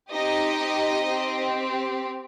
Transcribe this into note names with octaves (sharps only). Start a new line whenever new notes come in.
C4 D#4 G4 D#5
C4 G4